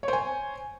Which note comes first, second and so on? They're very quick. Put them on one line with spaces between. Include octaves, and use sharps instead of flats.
C#5 C5 G#5